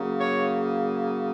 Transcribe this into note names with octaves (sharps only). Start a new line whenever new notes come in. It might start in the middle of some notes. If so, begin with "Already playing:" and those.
Already playing: C#3 F#3 A#3
C#5